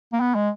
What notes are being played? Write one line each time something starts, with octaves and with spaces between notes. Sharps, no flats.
A#3
B3
G#3